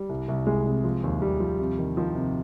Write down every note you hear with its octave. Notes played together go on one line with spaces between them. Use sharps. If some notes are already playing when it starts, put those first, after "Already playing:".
Already playing: G3
C2
C2
C2 G#3
C3
F3
D#2
D#2 G3
F3
C3
D#3
D#3 F3
C3